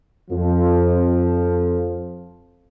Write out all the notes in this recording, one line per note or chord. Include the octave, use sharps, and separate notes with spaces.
F2 F3